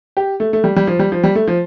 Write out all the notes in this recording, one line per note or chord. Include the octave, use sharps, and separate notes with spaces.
G4
A3
A3
G3
G3
F3
G3
F3
G3
A3
F3